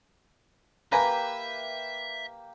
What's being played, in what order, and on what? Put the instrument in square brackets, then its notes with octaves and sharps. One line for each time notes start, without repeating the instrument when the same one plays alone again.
[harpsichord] A#3 G4 [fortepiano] B4 [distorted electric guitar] E5 [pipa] G5 G#5 A#5